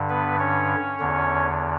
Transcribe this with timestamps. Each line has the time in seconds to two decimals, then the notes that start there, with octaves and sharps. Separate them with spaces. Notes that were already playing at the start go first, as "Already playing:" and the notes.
Already playing: G2 D3
0.09 B3 B4
0.39 C#4 C#5
1.00 E2 D3